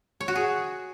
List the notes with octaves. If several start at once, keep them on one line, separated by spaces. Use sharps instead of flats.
C#5
F#4
G#4